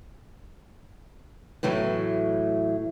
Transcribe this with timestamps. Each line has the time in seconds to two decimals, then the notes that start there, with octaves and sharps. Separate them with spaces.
1.63 A2 E3 F#3 A3